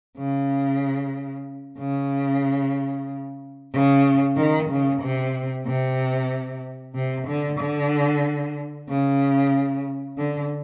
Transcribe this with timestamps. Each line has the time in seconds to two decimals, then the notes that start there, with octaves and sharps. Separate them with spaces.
0.18 C#3
1.79 C#3
3.73 C#3
4.37 D#3
4.70 C#3
5.01 C3
5.66 C3
6.95 C3
7.27 D3
7.59 D3
8.89 C#3
10.18 D3